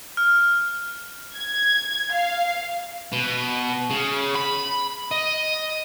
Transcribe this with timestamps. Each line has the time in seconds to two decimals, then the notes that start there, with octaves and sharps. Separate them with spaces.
0.17 F6
1.35 G#6
2.12 F5
3.12 B2
3.90 C#3
4.35 B5
5.11 D#5